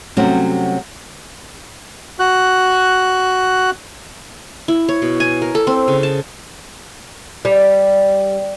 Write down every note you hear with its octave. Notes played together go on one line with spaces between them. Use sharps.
C3 F#3 G3 A3 C#4 F#4
F#4 F#6
E4
C#5
B2
G#5
A#4
A4
C4
C#3
A5
G3